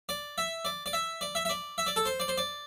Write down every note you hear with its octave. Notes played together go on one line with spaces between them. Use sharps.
D5
E5
D5
D5
E5
D5
E5
E5
D5
E5
D5
A4
C5
D5
C5
D5